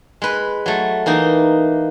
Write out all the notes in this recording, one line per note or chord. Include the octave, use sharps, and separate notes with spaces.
G#3 B4
F#3 A3
E3 A#3 D#4